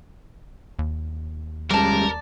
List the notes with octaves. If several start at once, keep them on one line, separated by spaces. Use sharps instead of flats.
D#2
G3 G#3 C#4 A#4 D5 A5